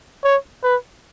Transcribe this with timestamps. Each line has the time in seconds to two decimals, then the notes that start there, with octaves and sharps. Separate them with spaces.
0.24 C#5
0.63 B4